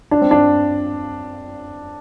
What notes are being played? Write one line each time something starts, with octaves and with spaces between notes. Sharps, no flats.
D4
C4
D4